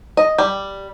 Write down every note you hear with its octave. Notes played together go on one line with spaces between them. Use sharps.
D#5
G3